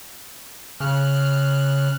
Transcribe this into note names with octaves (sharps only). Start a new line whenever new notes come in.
C#3 F6 F#6